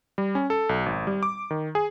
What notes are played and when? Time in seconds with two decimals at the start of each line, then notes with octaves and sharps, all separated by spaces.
0.18 G3
0.35 C#4
0.50 A4
0.69 B1
0.86 G#1
1.07 G3
1.23 D6
1.51 D#3
1.75 G#4